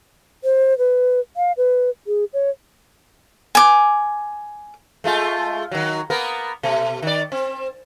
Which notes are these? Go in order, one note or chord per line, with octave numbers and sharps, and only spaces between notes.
C5
B4
F5
B4
G#4
C#5
G#5 D6
G#3 A3 F4
D#3 F#3
A#3 B3 A#4
B2 A3
D#3 D5
C4